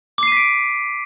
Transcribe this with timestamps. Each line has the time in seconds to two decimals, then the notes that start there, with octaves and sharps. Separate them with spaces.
0.18 D6
0.23 C7
0.27 D#7
0.32 B6
0.37 D7